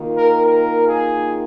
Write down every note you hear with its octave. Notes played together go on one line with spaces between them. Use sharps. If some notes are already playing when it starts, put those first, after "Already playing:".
Already playing: D#3 A#3 F4
A#4
A#4
G#4